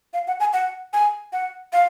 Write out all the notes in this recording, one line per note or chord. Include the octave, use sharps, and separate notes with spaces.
F5
F#5
G#5
F#5
G#5
F#5
F5